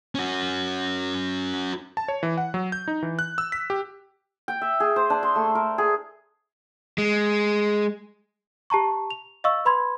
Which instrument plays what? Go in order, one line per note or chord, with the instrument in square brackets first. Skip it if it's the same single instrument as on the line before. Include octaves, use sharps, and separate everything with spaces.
[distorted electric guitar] C#4 F#4
[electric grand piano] A5
C#5
E3
F#5
F#3
G6
D#4
E3
F#6
E6
B6
G4
[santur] G5
E5
G#4
C5
D4
C6
A3
A#4
G#4
[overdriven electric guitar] G#3
[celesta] G4 A5 A#5 C#6
F7
D#5 F5 C#6 E6
B4 B5 C6 G#6